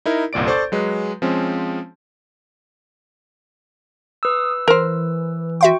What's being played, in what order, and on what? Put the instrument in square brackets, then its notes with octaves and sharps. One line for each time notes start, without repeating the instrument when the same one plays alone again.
[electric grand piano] D#4 E4 A#4
G1 C2 A#2 D5 D7
A4 C5 D5 C#6 G6 A6
F#3 G#3 B4
F3 G#3 C4 C#4
[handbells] B4 E6 [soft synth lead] D#6
[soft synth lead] E3 [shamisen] A#4 C5
[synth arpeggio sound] F#4 E5 C6 [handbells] G5 C#6